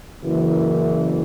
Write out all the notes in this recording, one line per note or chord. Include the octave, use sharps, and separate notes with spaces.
F#1 F#2 E3